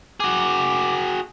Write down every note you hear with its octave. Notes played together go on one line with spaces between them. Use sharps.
F#4 G#4 D6